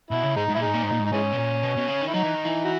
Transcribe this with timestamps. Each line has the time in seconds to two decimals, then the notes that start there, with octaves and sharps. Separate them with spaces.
0.10 B2 E4
0.23 C#3
0.36 G#2 G#3 D#4
0.49 G#2
0.55 A#2 E4
0.61 G#2 G#3 D#4
0.74 A#2
0.83 G#2
0.87 A#2 D#4
1.00 G#2
1.05 D#4
1.12 G#2 E3 G#3 C#4
1.32 B2
1.37 A#2
1.63 B2
1.76 B2
1.88 C#3
2.01 D#3
2.07 E4
2.13 F#3 D#4
2.23 E3
2.34 D#3
2.45 E3
2.64 D#4 F#4